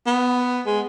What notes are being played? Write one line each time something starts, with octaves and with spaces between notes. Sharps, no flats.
B3
G#3